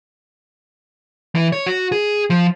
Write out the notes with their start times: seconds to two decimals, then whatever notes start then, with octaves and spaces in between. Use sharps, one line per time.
1.35 E3
1.53 C#5
1.66 F#4
1.92 G#4
2.30 F3